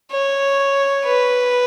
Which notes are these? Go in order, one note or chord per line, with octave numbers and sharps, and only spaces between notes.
C#5
B4